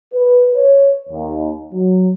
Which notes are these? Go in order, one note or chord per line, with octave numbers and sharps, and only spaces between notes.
B4
C#5
D#2
F#3